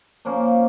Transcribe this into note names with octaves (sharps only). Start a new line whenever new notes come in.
A#2 F3 A#3 C#4